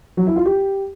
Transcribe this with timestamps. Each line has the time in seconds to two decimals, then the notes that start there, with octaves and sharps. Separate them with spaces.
0.17 F#3
0.27 E4
0.36 F4
0.45 G4